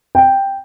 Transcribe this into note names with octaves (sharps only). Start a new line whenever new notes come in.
G5